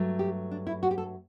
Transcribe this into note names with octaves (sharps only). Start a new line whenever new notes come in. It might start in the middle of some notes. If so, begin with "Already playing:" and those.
Already playing: G2 F#3 A3
G4
D4
E4
F#4
G4
A4